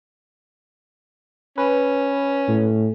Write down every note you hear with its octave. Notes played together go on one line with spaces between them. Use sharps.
C#4 B4
A2